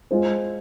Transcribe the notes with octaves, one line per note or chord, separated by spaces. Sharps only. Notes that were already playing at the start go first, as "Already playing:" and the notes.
G#3 F4 C5